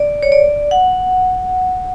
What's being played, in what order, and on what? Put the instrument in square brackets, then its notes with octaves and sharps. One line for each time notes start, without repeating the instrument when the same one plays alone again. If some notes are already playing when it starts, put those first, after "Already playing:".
Already playing: [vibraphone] D5
C#5
D5
F#5